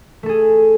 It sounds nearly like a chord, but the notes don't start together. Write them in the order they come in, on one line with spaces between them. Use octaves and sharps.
A3 A4 G#4